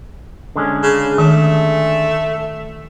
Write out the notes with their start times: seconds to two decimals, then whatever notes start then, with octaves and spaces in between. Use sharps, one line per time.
0.56 D3 G#3 C#4
0.83 C#3
1.18 D#3 A3